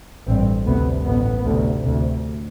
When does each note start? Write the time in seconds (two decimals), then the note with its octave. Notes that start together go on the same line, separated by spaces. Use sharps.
0.28 A1 G2 C4
0.67 D2 C3 B3
1.06 A1 A2 B3
1.45 D2 C3
1.84 D2 C3